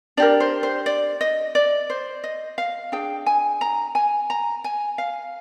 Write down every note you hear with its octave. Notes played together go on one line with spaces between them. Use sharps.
D4 G4 A#4 D5
C5
C5
D5
D#5
D5
C5
D#5
F5
D4 G#4 G5
G#5
A#5
G#5
A#5
G#5
F5